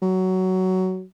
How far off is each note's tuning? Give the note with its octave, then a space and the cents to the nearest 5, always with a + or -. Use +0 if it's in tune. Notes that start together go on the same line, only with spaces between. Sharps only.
F#3 +15